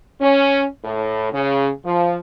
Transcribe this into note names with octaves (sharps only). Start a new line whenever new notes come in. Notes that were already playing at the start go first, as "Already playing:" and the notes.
C#4
A2
C#3
F3